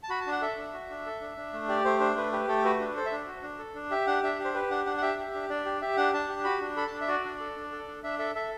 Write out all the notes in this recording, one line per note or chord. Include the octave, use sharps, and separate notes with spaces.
A5
F#4 B5
A5
D4
F#5
A4 E5
D4
F#4
D4
A4
D4
D4
A3
G4 D5
A3 C5
D4 C5
A3 B4
G4 B4
A3 A4
F#4 B4
D4
A4 C5
E5
D4
F#4
D4
A4
D4
G4 E5
D4 F#5
D4 E5
G4
C5
G4 B4
D4 F#5
D4 F#5
F#5
G4 E5
G4
D4
D4 D5
G4
G4 E5
D4 F#5
D4 A5
G4
F#4 B5
D4
A4 B5
A5
D4
E5
F#4 D5
D4
A4
D4
A4
D4
D4 E5
A4 E5
A4 E5